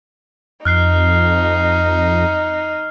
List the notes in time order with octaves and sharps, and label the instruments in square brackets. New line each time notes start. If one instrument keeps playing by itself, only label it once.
[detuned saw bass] F2 [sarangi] D#4 [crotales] F6 F#6 C7